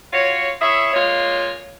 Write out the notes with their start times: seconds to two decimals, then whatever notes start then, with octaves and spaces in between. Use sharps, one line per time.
0.13 F4 F#4 C#5
0.62 E4 G#4 C#5 E5
0.94 G#3 A#3 F4 C#5